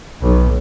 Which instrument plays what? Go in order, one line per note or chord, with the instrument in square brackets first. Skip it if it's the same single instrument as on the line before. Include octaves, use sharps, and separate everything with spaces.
[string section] B1